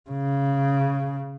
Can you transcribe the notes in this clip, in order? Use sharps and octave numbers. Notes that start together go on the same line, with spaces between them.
C#3